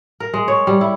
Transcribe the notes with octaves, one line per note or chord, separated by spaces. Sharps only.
A#4
G#3
C#5
G3
E4